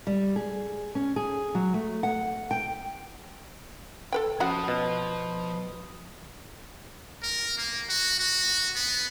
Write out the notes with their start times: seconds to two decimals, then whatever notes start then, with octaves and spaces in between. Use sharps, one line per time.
0.07 G3
0.36 G#4
0.95 C#4
1.16 G#4
1.55 F#3
1.74 A3
2.03 F#5
2.51 G5
4.12 A4 B4 G5
4.40 F3 C#4 F#4 F#5 A5 B5 D#6
4.68 B2
7.23 A#4
7.58 A#3
7.89 F#4
8.20 F#4
8.76 B3